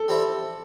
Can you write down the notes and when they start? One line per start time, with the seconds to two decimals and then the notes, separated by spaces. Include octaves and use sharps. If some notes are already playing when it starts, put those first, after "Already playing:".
Already playing: A4
0.08 G3 C4 E4